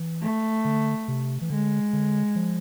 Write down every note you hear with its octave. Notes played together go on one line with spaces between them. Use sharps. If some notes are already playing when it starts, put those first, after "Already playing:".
Already playing: E3
A3
D3
C3
E3
D3 G#3
D3
F3